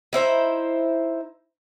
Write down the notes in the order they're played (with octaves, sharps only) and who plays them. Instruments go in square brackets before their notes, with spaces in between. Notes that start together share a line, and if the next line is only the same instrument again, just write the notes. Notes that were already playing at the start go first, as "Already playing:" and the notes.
[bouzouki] D#4 E4 C5 E5